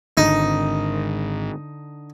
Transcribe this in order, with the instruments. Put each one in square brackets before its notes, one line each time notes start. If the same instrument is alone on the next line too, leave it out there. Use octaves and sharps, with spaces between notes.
[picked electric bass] G#1 [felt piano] D3 [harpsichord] D#4